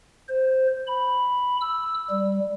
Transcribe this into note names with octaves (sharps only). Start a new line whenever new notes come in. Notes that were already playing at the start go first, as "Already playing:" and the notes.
C5
B5
E6
G3